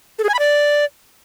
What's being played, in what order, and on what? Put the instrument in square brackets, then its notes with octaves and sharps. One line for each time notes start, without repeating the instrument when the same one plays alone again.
[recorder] A4
G#4
G#5
B5
D5